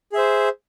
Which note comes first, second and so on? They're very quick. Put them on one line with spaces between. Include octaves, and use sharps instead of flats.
G#4 E5 C5